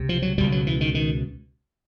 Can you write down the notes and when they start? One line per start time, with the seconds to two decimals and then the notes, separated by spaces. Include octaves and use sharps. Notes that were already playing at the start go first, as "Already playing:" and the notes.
Already playing: C#2 C3
0.09 F3
0.22 F#3
0.38 C#2 B2 G3
0.52 F#3
0.67 E3
0.81 D#3
0.95 D#3